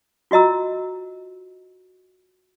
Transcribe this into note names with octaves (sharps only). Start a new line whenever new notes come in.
F4 F#4 D#5 A#5 E6